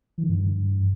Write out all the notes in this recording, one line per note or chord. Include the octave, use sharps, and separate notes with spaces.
E3
D#3
G2